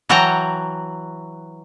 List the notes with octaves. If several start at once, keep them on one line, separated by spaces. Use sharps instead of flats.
E3 F#3 F#4 G5 A5 A#5